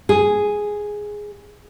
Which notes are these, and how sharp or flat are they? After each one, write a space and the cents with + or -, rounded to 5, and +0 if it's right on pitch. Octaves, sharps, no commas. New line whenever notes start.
G#4 +0